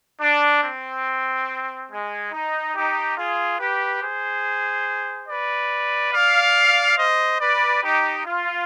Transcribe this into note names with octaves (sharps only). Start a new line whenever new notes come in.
D4
C4
G#3
D#4
D#4 G4
F4 G#4
G4 B4
G#4 C5
B4 D5
D5 F5
C5 D#5
B4 D5
D#4 G4
F4